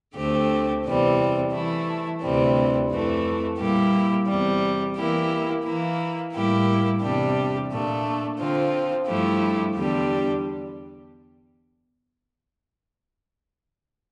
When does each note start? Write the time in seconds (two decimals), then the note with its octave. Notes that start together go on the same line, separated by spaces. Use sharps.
0.16 D2 D3 A3 C4 G4
0.85 E2 C3 E3 G3 C4
1.53 E3 A3 E4
2.21 D2 C3 E3 G3 C4
2.90 F2 E3 A3
3.58 A#2 G3 A#3 E4 G4
4.27 E2 C3 G3
4.96 E3 A#3 E4 G4
5.64 E3 A#3 E4
6.33 A2 G3 A#3 E4 G4
7.02 E2 C3 G3 D4 G4
7.70 A#2 A3 D4
8.39 D3 F3 C4 F4
9.07 G2 F3 A3 E4 G4
9.76 E2 D3 G3 D4 G4